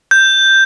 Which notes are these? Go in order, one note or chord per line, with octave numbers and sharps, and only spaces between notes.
G6